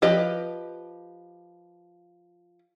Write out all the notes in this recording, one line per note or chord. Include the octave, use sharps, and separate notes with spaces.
F3 G4 B4 D#5